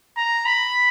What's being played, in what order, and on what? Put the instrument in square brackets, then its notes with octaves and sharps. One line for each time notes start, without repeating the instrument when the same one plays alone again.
[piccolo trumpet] A#5
B5